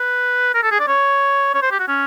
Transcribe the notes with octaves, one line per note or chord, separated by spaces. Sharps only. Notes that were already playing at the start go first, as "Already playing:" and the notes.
Already playing: B4
A#4
A4
G#4
D5
C#5
C#5
C5
G4
F#4
C#4